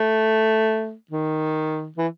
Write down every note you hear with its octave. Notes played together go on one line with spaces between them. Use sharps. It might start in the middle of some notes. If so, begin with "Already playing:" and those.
Already playing: A3
D#3
E3